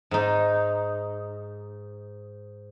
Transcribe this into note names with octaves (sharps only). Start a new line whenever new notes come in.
G#2 D#4